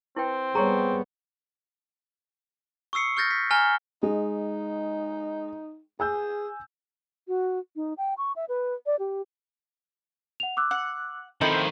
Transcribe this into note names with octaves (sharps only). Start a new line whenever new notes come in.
C4 E4 B4 G5
G3 B3 G#4 C#5 A#5 C#6
C#6 D#6 E6 C7 C#7
C#6 F6 G6 A6 A#6
B6
G#5 A#5 F6 G7
G#3 D#4
G#4 G#5 E6 G6
F#4
D#4
G5
C#6
E5
B4
D5
G4
F#5 F7
D6 E6 F#6
F#5
D#3 F3 C4 E4 A4 C5 D#5 F#7